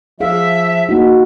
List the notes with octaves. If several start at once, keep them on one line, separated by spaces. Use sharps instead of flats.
F3 G#4 E5 F5
A#3 D#4 F#4